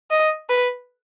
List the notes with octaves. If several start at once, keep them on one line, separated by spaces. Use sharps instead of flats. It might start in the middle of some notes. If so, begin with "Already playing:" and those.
D#5
B4